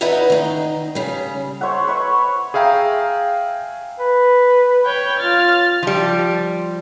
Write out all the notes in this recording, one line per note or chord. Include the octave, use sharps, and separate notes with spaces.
E2 D#4 E4 B4 D#5 F#5
D#3 D#4
C#3 G3
C5 C#5 E5 F#5
B4 C#5 E5 C#6
G#4 E5 F5 G5 A#5
B4
C#5 G5
F4 F6 A6
F3 G3